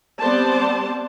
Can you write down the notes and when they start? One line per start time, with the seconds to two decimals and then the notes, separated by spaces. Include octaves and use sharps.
0.21 G3 B3 C4 C5 D5 A5